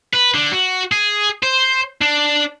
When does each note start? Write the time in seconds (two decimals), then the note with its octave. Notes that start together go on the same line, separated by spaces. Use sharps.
0.14 B4
0.34 D3
0.52 F#4
0.92 G#4
1.43 C5
2.01 D4